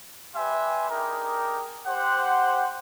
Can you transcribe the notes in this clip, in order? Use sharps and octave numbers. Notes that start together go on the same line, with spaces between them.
G3 G4 B4 E5 G#5 C6
D4 D#4 G4 G#4 A#4
G4 C5 F#5